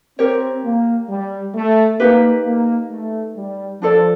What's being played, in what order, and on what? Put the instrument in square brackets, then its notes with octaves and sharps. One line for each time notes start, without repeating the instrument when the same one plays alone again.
[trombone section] C4 [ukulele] G4 A#4 C#5
[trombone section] A#3
G3
A3
[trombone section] A#3 [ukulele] D#4 G4 B4
[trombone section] A#3
A3
G3
[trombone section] F3 [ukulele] D4 F4 A4 D5